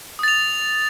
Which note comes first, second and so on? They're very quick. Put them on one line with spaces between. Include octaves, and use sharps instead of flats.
D#6 A6 F7